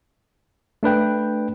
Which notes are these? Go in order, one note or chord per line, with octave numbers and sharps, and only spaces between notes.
A3 D4 B4 G5